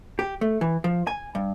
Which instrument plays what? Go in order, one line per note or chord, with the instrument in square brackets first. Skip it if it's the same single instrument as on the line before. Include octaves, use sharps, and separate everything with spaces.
[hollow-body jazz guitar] G4
A3
E3
F3
G#5
G2